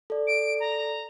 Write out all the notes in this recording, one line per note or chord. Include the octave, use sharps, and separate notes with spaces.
A4 D5
D7
A#5